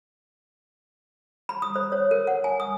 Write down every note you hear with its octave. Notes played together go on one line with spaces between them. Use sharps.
B5
D#6
C5
C#5
A#4
F#5
G#5
D#6